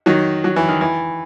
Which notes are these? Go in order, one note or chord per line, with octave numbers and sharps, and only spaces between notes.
D#3 F#3
F#3
E3
D#3
E3